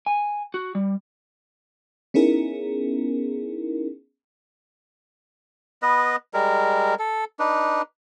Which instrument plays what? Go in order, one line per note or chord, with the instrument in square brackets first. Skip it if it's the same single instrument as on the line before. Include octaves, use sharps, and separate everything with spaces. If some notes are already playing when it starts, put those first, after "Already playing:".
[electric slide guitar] G#5
F#4
G3
[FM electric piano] B3 C#4 D#4 E4 G#4 A#4
[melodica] B3 B4 D#5
G3 G#3 A#4
A4
D4 D#4 B4